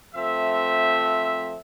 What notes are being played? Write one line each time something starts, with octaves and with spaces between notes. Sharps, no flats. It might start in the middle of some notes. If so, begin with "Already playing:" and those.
F3 A3 C4 E5